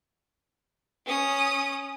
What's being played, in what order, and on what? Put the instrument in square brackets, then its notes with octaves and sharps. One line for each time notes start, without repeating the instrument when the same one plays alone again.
[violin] C#4 D#6